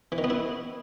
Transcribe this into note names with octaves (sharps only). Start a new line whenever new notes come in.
E3
D#3
B3
E4